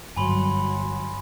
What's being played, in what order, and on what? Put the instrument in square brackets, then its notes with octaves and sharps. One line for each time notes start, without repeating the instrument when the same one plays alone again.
[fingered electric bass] G1 G2 [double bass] F#3 [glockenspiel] G#5 B5 C6